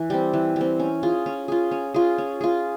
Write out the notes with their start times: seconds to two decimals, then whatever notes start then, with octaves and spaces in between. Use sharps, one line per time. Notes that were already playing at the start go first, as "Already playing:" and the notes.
Already playing: E3
0.10 G3 C4
0.34 E3
0.56 G3 C4
0.80 C#4
1.03 F4 G#4
1.26 C#4
1.48 F4 G#4
1.71 C#4
1.94 F4 G#4
2.18 C#4
2.41 F4 G#4